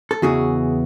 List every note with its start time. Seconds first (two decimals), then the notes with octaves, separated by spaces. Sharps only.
0.11 A4
0.22 E2 C#3 E3 F#4 G#4